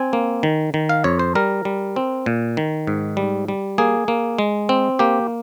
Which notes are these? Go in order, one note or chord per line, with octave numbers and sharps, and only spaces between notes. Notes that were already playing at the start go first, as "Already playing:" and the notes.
Already playing: C4 G#5
A#3
D#3
D#3
F5
F2 C#5
C5
G3 A#4
G3
C4
A#2
D#3
G#2
G3
G3
A#3 G#4
A#3
G#3
C4
A#3 G4